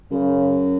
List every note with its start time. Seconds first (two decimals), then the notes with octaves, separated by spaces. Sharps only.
0.11 F#2 C#3